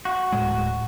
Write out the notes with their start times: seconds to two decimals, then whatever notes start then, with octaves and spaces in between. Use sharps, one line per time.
0.05 F#4
0.32 D1 A2 G#3